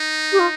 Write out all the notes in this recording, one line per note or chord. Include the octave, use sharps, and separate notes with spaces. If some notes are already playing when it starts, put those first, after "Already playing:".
Already playing: D#4
G4
F4